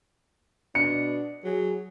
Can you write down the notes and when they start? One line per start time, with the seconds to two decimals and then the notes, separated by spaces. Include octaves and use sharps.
0.75 B2 D4 C#7
1.44 F#3 G#4